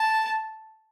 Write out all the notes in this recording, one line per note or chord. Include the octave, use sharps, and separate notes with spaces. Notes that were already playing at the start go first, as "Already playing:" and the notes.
Already playing: A5